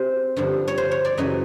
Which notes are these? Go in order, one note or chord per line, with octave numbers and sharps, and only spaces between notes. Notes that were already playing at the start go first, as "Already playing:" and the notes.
Already playing: G#3 C4 G4 C5
G2 D3 F3
C#5
C5
C#5
D5
F#2 C#3 E3 D#5